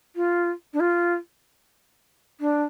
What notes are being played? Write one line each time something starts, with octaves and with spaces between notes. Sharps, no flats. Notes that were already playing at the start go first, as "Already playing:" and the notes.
F4
D4
F4
D4